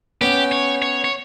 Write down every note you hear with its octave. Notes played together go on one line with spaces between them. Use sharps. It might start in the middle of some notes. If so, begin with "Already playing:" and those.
B3 C#4 G4
C#5
C#5
C#5